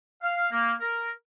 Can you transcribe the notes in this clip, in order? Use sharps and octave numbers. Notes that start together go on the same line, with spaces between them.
F5
A#3
A#4